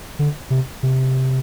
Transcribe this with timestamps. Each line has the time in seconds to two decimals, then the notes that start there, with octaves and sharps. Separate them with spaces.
0.19 D3
0.50 C3
0.83 C3